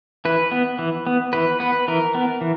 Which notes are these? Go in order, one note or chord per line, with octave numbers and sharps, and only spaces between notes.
E3 B4
B3
E3
B3
E3 B4
B3 B4
E3 A#4
B3
E3